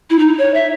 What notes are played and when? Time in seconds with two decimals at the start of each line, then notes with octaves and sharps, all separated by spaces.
0.10 E4
0.19 D#4
0.38 C#5
0.54 E5